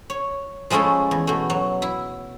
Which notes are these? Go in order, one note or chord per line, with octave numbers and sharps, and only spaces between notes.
C#5
F3 G#3 A3 C#4 E4 A4
E2
B2 A3
F#3
E4